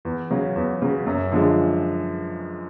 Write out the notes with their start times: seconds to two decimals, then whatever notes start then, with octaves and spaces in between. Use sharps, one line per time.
0.05 E2
0.30 C#3 F#3
0.56 E2
0.82 C#3 F#3
1.06 F#2
1.32 D3 F3 G#3